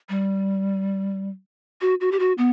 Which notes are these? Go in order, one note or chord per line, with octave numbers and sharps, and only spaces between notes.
G3
F#4
F#4
G4
F#4
B3